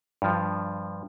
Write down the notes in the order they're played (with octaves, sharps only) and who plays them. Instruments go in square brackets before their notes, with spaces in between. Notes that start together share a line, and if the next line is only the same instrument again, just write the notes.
[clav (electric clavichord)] G2 F3